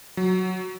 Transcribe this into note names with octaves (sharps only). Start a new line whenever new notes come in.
F#3